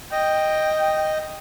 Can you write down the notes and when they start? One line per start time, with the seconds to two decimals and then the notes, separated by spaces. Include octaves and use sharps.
0.12 D#5 G5